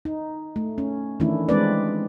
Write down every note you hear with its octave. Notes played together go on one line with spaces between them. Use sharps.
D#4
A3
C#4
D#3 E3 A3 C#4 D4 E4
G3 G#3 C4 D4 B4 D5